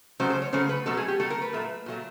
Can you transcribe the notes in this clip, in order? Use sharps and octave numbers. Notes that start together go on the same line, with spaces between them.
C#3 F#3 A3 C5
C5
C#5
C#3 F#3 A3 C5
B4
B2 F#3 A3 A4
G#4
G4
B2 F#3 A3 A4
A#4
B4
A#2 F#3 A3
A#2 F#3 A3